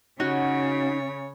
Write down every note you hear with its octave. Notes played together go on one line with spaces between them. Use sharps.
C#3 C#4 D#4 F#4 C#5